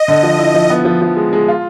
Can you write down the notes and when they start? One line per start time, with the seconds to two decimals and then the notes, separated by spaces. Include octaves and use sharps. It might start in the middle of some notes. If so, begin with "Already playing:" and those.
Already playing: D#5
0.08 D3
0.23 F3
0.39 E4
0.55 F3
0.70 B3
0.85 F3
1.02 F3
1.17 G#3
1.33 G#3
1.48 F4